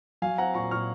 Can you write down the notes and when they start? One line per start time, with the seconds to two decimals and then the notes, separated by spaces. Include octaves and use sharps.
0.22 F#3 F5 G#5
0.38 C4 F#5 A#5
0.54 A#2 A#5 C#6
0.71 A#2 C#6 F6